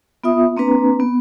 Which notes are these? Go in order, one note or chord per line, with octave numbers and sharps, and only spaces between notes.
B3 F4 E5 D#6
A#3 C4 D4 B4 A#5
B3